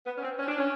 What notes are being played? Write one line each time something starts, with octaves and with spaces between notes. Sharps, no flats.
B3
C#4
C4
C#4
D4
C#4